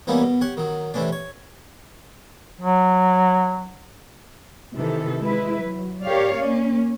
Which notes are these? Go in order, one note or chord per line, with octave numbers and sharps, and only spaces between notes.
E3 G3 A#3 B3 C#4 D#4
B2
G4 C#5 F#5
D#3 F#3
C3 E3 A3 C#4 D4
C#5
F#3
C3 D#3 E3 A4
G#3 E4 B4
F#3
G4 A#4 C#5 D5 F5
A#3 C#4